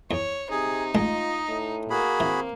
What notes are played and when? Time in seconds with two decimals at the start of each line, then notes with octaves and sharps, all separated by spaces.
0.11 E2 C#5
0.51 C3 D#4 G#4
0.95 A1 G#3 F4 D#5 A5
1.48 A2
1.90 A#3 F#4 G#4 B5
2.20 E3 C4